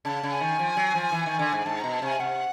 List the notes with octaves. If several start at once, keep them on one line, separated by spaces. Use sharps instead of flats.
C#3 A5
C#3
G#5
D#3
F3
F#3
F3
E3
D#3
D3
G#2
G#2 A5
B2 A#5
A5
C3 G#5
C3 F#5